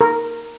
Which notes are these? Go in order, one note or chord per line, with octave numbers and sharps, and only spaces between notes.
A#4